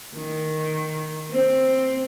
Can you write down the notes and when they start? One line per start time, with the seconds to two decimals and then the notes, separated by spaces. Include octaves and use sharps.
0.16 D#3
1.31 C4